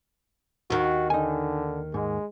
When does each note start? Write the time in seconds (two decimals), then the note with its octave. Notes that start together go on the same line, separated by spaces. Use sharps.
0.70 D#2 D#3 F#4
1.10 D3 D#4 G#5
1.94 G#2 G#3